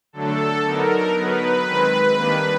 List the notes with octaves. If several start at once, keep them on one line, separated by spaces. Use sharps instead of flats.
D3 F#3 A3 D4 A4
D3 F#3 B3 D#4 A#4
F#3 B3 D#4 B4
D#3 G#3 C4
D#3 G3 A#3 D4